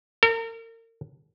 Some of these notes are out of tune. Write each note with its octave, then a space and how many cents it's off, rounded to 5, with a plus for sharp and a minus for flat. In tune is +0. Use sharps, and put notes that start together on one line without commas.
A#4 -35